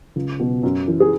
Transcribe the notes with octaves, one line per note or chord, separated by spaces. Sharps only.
C#2
B2 F#3
F#2
E3
G#4